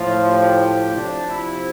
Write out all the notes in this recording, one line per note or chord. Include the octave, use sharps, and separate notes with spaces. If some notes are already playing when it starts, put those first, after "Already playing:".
Already playing: A2 F3 F4
G4
C3 F3 D4
E4